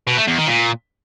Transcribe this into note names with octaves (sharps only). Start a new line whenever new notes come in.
B2
A3
E2
D#3
A#2